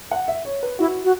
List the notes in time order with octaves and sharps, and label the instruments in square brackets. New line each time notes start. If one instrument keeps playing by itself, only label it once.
[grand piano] F#5
E5
C#5
B4
[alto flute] E4 [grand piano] F#4
[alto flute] F#4